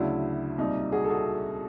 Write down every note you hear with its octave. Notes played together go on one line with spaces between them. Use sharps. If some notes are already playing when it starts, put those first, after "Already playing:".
Already playing: D2 C#3 F#3 D4 E4
C2 A#2 G3 D#4
F#4 G#4
A4
F#4 G#4